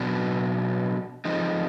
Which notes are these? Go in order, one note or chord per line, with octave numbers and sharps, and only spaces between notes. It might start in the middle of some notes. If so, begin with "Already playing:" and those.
Already playing: B2 F#3 B3 D4 F#4
F3 G#3 C4 D#4